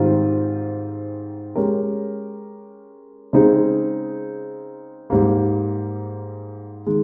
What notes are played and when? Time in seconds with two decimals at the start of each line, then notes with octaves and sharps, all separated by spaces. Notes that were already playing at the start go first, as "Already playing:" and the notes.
Already playing: G#2 D#3 G3 C4 F4
1.56 G#3 C#4 G4 A#4
3.33 C#3 G#3 C4 D#4 G#4
5.10 G#2 G3 A#3
6.86 D#3 G#3